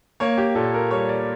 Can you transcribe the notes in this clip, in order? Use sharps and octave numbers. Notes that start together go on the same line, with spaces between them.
A#3 C#5
G4
A#2 A4
A#4
G3 C#5
D5